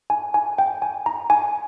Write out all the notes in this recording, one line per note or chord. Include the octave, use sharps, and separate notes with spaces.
G#5
G#5
G5
G#5
A#5
G#5